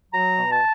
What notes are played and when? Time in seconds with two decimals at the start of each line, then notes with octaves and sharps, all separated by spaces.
0.12 F#3 A#5
0.37 B2
0.50 A5